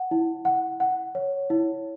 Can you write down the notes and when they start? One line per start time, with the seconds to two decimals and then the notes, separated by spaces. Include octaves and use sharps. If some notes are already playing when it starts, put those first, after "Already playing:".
Already playing: F#5
0.11 E4
0.45 F#5
0.80 F#5
1.15 C#5
1.50 E4